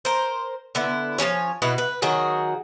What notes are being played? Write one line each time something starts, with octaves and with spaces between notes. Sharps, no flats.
A#4 C5
D3 B3 E4
F3 F#3 C#4 C#5
B2 E4 F#4 B4
B4
D#3 F#3 F#4 G#4